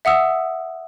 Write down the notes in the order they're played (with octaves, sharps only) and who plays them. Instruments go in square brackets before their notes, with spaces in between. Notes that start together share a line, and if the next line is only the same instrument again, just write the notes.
[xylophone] E5 F#5 D#6 E6